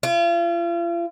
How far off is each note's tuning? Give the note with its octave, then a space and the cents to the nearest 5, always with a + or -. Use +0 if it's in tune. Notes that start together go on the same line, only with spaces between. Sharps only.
F4 -40